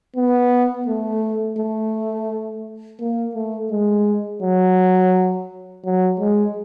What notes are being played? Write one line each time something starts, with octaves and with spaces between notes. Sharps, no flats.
B3
A3
A3
A#3
A3
G#3
F#3
F#3
G#3